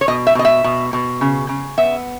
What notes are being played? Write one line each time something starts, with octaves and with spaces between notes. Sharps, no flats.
C#5
B2 D#5
E5
B2 D#5
E5
B2
B2
C#3
C#3
B3 E5